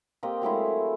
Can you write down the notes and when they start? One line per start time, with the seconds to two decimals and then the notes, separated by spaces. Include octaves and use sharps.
0.23 A#3 C4 G4 D#5
0.42 F#3 G#3 A3 E4